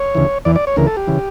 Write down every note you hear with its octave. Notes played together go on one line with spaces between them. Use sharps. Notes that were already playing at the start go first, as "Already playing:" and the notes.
Already playing: C#5
D2 C#3 E3
E2 E3 D5
D5
C#5
D2 C#3 E3 A#4
A4
G4
C#3 E3